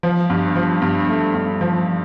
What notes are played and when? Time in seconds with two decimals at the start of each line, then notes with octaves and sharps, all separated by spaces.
0.03 F3
0.30 G2
0.56 F3
0.82 G2
1.09 A3
1.34 G2
1.61 F3